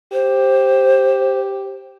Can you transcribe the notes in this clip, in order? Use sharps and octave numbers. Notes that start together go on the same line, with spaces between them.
G4 C5